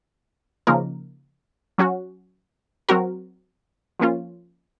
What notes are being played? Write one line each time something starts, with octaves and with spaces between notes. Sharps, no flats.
C#3 F3 A#3 D#4 A#4
F#3 C#4 F#4
F#3 C4 F#4 A#4
F3 A#3 C#4 F4